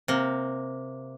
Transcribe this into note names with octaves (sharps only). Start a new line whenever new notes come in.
C3 A#3